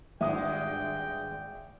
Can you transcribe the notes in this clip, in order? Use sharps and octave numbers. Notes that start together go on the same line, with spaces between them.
G#1 G2 G#3 E5 G5 D#6